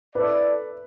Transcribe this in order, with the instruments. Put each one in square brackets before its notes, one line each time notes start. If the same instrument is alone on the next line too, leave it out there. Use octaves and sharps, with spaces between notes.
[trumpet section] E4 A4 D5 [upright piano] B4